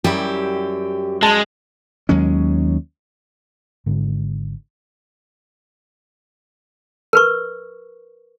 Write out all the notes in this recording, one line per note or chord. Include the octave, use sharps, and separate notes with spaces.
F#2 G3 E4 G4
G#3 A5
D#2 F#3 G#3 C#4
G#1 G#2 D3
A#4 B4 C#6